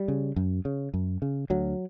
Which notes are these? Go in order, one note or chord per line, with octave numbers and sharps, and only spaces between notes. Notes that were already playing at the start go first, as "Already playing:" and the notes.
Already playing: G3
C#3
F#2
C#3
F#2
C#3
D2 F#3